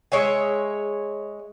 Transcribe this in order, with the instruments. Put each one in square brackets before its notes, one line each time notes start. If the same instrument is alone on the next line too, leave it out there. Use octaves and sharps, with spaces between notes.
[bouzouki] G#3 C#5 E5 G#5